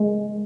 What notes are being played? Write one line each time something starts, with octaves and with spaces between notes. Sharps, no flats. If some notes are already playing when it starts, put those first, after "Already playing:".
Already playing: G#3